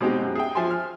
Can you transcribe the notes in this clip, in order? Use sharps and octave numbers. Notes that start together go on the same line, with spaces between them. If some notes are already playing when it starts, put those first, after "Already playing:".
B2 G#3 C4 D#4 G4
F#2
G#4 E5 G5
F3 E5 G#5 C6
F6